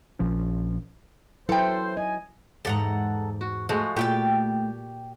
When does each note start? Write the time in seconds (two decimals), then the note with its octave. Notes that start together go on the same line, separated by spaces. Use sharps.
0.19 A#1 A#2 F3 C#4
1.49 F#3 E4 A4 B4 C5 G5
1.97 D#5 G#5
2.65 E2 G#2 G4 A4 F#5 A#5
3.41 F#4
3.69 F3 G#3 A3 F#4
3.97 A#2 A3 E4 G4 G5 A5